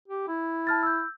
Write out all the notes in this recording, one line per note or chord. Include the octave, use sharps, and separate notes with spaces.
G4
E4
A5 F6 A6
E6 G6